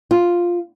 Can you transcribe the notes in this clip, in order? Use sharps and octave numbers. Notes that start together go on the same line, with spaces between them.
F4